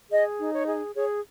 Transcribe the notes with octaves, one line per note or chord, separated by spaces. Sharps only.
G#4 D#5
D#4
C#5
G#4
G#4 C#5